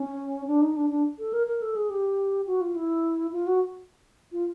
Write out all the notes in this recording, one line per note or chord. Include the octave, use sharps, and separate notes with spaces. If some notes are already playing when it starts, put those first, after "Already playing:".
Already playing: C#4
D4
D#4
D4
D4
A4
A#4
A#4
A4
G#4
G4
F#4
F4
E4
F4
F#4
F4